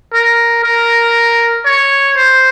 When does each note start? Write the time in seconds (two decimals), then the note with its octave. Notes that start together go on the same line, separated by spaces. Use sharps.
0.14 A#4
0.64 A#4
1.65 C#5
2.17 C5